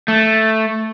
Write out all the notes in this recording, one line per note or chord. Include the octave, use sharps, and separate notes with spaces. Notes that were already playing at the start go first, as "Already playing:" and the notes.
A3